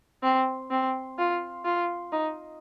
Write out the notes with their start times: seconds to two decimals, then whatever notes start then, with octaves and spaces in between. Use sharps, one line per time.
0.23 C4
0.71 C4
1.18 F4
1.65 F4
2.12 D#4